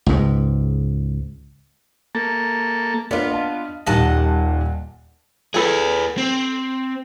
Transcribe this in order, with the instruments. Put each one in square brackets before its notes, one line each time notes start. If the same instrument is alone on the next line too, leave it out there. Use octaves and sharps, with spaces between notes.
[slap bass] C#2 G#2
[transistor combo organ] A#3 A4
[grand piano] A#3 [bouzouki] B3 F4 [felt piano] D4 D5 F5
[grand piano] D#5 A5
[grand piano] D#1 [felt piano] A#2 D#3 G3 [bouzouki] D#5 F#5 A5
[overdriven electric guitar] G#4 B4 [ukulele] A4 G5
[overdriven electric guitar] C4